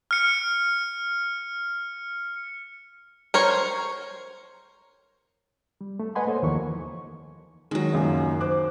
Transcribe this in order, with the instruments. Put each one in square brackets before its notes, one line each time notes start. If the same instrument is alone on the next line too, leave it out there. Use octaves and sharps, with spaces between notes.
[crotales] F6 C#7
[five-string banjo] A#4 C5 C#5
[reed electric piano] G3
A3
B4 D#5 F#5 G#5 B5 C6
A#3 A4 C5 C#5 D#5
D#2 E3 F3 A#3 C#6
[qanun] D#3 F#3 [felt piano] G#3
[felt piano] C#2 F#2 A#2
C5 D6 F#6